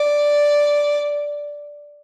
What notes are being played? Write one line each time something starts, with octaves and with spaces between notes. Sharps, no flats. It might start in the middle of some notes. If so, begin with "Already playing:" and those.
Already playing: D5